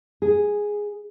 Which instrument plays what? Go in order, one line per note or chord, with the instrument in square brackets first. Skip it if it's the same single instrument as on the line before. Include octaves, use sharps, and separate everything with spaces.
[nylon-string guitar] G#4